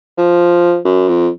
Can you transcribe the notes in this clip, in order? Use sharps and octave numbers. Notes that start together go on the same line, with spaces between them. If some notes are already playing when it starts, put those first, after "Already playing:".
F3
F#2
F2